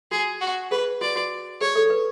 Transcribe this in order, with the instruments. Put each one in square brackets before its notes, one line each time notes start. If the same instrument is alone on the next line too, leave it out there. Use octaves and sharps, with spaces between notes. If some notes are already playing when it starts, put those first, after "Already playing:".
[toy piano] F#4 [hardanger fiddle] G#4
[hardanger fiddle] F#4
[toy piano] G#4 [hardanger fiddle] B4
[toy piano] F#4 [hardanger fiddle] D5
[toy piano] F#4
[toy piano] G#4 [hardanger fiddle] C#5
[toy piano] A4
A4
B4